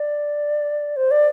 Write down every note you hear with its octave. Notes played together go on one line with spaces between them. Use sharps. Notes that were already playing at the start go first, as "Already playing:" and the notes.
Already playing: D5
C5
D5